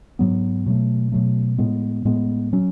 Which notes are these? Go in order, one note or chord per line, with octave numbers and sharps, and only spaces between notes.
G#2 F#3 B3
B2 F#3 A3
B2 F#3 A3
A2 G#3 B3
A2 G#3 B3
F#3 C#4